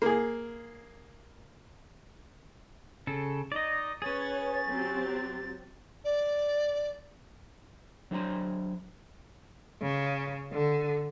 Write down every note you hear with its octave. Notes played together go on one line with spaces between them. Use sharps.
A#3 G#4
C#3 A4
D#4 D5 D#5
C#4 G#4 B4 C#5 A6
F#3 C4 G4
D5
F#3 D4 C5 G#5 A#5 C6
C#3
D3